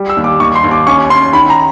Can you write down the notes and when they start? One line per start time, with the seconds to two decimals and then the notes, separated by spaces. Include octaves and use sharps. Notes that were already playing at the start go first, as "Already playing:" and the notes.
Already playing: G3
0.10 E6
0.17 D#2
0.24 D6
0.40 D#2 C#6
0.55 C6
0.64 D#2
0.71 D6
0.87 C#4 C#6
1.10 C#4 C6
1.33 D#3 B5
1.50 A#5